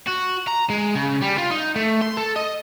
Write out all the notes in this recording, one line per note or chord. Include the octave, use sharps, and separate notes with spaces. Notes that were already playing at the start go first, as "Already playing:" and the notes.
F#4
A#5
G#3
C#3
G3
F4
D#4
A3
C6
A4
D#5